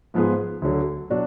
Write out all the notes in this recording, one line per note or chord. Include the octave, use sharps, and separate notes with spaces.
G#2 F3 B3 F4 G#4
D2 D3 F#3
B2 F#3 D4 F#4